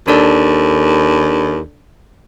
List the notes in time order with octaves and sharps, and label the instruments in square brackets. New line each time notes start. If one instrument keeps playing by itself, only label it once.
[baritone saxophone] D#2 [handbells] D4 A4 D5